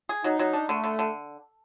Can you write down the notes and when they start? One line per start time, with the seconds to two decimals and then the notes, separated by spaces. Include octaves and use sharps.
0.09 G#4
0.24 F#3 D#4
0.39 F#3
0.53 D4
0.69 D3 A3
0.84 D3
0.99 D3